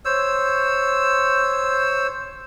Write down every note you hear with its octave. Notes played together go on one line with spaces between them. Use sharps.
C5 C#5 E6